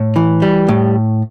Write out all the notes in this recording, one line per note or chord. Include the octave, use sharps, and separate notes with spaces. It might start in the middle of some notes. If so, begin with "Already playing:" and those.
Already playing: A2
E3
G3
A2